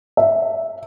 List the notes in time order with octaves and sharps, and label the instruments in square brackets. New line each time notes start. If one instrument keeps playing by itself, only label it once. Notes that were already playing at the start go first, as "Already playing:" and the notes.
[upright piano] E5